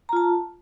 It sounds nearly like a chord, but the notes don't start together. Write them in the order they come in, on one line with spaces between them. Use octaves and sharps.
A#5 F4 A5